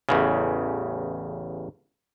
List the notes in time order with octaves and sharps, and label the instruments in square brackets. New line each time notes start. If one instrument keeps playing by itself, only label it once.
[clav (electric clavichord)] A1 E2 C#3